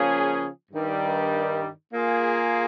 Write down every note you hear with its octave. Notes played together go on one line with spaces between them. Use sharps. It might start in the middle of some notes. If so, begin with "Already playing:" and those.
Already playing: C#3 F3 A#3 C#4 G#4
G2 D#3 G3
A#3 F4 G#4